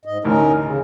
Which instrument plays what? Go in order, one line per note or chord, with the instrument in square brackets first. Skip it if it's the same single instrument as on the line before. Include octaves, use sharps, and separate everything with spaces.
[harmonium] G#2 D#5
[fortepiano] A1 D2 [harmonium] C#4 D#4 A#4
[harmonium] C#3